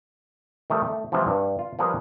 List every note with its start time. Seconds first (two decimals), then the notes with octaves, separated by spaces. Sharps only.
0.70 D#3 F3 G3 A3
0.88 A3
1.12 G#2 C3 E3 F3
1.27 G2
1.59 F4
1.79 F3 G3 G#4 A#4 B4